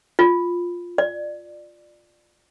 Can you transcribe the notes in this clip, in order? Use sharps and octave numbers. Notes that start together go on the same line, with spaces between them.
F4
D5